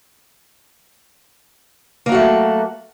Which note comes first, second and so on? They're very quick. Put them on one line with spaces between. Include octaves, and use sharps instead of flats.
A#3 F#3 F#4 A3